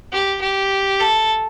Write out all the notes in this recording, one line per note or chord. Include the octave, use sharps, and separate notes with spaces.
G4
G4
A4